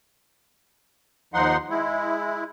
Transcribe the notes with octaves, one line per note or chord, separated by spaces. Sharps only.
D#2 F3 D#4 F#5 C6
G#3 E4